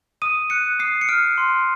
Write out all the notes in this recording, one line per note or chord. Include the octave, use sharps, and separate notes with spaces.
D#6 D#7
F#6 C#7
D#6 C7
C#7
F6 D7
C6